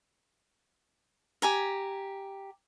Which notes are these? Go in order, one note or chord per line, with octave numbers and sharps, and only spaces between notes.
G4 G#5 A#5